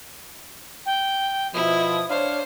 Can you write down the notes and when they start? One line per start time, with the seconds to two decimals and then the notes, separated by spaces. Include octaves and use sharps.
0.86 G5
1.54 B2 F3 E4 D#6
2.09 D4 C5 C#5 F5